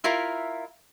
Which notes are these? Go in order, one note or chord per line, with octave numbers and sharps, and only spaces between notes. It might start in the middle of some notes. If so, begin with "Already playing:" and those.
E4 F4 A#4 E5